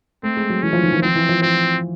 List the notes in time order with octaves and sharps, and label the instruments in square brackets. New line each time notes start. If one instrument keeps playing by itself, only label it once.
[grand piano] A3 [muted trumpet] C4
[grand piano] G#3
F#3
[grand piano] E3 [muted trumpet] C#4
[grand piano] F3
D#3
E3
[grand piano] F3 [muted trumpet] C4
[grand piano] E3
F3
[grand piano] F3 [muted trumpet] C4